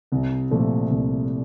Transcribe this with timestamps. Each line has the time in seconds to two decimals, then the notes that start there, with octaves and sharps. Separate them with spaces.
0.12 C2
0.51 A#2 F3 A3
0.90 C2